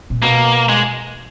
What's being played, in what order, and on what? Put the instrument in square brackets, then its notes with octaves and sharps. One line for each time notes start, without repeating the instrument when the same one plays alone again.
[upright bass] A#2
[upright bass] B2 [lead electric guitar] A#3
[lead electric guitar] G#3